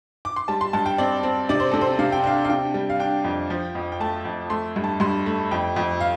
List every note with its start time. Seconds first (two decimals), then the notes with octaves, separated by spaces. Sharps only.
0.25 D6
0.36 C6
0.48 G3 A5
0.61 C6
0.73 G2 A5
0.86 G5
0.98 C4 D5
1.23 C4
1.49 C3 D5
1.60 C5
1.71 C3 A4
1.81 C5
1.99 C3 F5
2.12 G5
2.24 D4 F5
2.45 F5
2.50 C3 G5
2.74 G3
2.90 F5
2.99 D4 G5
3.24 F2
3.50 F3
3.75 F2
3.92 G5
4.00 A3 A5
4.25 F2
4.50 A3 C6
4.76 G2
4.84 A5
5.00 G2 C6
5.26 A3
5.51 F2 G5
5.76 F2
6.00 F5